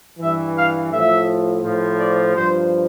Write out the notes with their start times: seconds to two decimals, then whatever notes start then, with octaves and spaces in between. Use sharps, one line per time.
0.19 G2 E3 E5
0.55 F5
0.91 A2 F3 E5
1.64 A2 F3
1.99 D5
2.35 G2 F3 C5